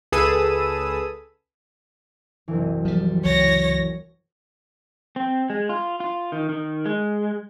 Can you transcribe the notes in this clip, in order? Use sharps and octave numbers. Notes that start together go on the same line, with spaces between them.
C#2 G#4 A4 B4 D#6 E6
F#1 C2 E3
F3 G3
C#2 C#5 A#6
C4
G#3
F4
F4
D#3
D#3
G#3